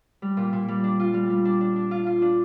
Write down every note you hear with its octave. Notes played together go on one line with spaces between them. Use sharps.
G3
A#2
A#2
G3
D4
F4
G3
G3
D4
D4
D4
F4
F4
D4